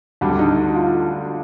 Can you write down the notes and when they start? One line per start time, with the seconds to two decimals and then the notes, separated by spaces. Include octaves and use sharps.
0.21 D2 D3 G3 D4
0.39 D#4
0.74 F4